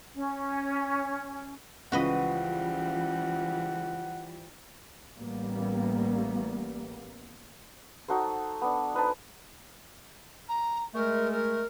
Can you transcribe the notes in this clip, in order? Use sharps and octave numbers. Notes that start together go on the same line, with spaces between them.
C#4
C#2 E3 F3 G3 F#4 B4 D#5 F#5
A1 G3 A#3 B3
D#4 F#4 A4 C5
B3 D4
D#4 B4 C5 A5
A#5
G#3 A3 A#4
A#4